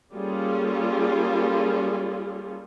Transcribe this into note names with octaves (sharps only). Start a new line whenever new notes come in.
G3 A#3 C#4 F4 G#4 A4